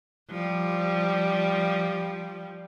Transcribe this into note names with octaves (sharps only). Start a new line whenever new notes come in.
F3 G3